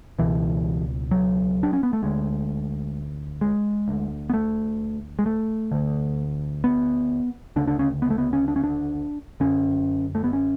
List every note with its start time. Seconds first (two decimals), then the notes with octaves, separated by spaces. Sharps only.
0.19 C#2 B2 E3
1.11 F#3
1.63 D4
1.73 C#4
1.83 B3
1.93 A3
2.03 D2 D3 G#3
3.41 G#3
3.88 D2 D3
4.30 B3
4.34 A3
5.19 G#3
5.26 A3
5.71 D2 D3
6.64 B3
7.56 D2 C#3 D4
7.67 D4
7.79 C#4
8.02 B3
8.10 A3
8.18 B3
8.33 C#4
8.48 D4
8.56 C#4
8.64 D4
9.40 F#2 D3 C#4
10.15 A3
10.24 B3
10.33 C#4